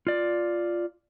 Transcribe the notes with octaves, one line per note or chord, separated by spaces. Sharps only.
F4 D5